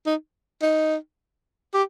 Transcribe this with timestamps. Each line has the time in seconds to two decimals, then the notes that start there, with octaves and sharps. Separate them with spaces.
0.06 D#4
0.62 D#4
1.74 G4